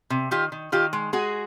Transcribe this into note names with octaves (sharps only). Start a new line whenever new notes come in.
C3
D#3 F4 G4
D#3
D#3 F4 G4
G#3
G#3 F#4 G#4